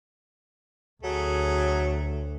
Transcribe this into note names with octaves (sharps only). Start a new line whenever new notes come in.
D2 F#3 A3 G#4